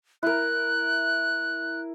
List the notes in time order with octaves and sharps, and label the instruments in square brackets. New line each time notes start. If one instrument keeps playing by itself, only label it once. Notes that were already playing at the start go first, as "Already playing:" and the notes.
[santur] E4 A#4 [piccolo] F#6